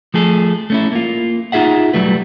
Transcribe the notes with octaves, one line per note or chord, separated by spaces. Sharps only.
F3 A3 G#4 A4
A3 C#4 E4
A#3 F4
D#4 F4 G#4 E5 F#5
B1 F#3 G3 A3 B4